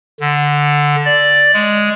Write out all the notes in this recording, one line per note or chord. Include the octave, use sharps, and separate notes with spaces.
D3
D5
G#3